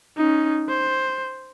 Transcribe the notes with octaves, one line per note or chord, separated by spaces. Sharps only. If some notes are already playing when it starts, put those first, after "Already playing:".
C#4 D#4
C5